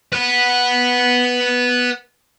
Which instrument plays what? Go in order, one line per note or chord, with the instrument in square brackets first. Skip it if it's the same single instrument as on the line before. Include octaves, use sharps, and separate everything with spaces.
[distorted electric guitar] B4 F#5